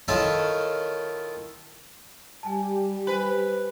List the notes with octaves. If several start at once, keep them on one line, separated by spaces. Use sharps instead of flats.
D#3 E4 F4 A4 C#5 G#5
G3 G4 G#5 A5
B4 C5 G#5